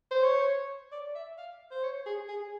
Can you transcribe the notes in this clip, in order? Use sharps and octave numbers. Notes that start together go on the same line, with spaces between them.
C5
C#5
D5
E5
F5
C5
C#5
G#4
G#4